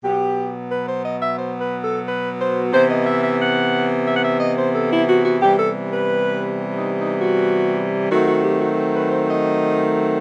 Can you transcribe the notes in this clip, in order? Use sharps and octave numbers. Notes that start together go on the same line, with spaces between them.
B2 F#3 B3 G4
B4
C5
D#5
E5
C5
B4
A4
B4
C5
C3 E3 B3 C5
D#5
E5
E5
F#5
E5
F#5
E5
D#5
C5
A4
E4
F#4
F#4
C3 E3 G3 B3 G4
A4
B4
D#4
D#4
F#4
D#3 F#3 A3 C4 F#4
F#4
G4
F#4
B4
C5
D#5